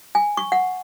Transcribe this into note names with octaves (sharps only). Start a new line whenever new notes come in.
G#5
C#6
F#5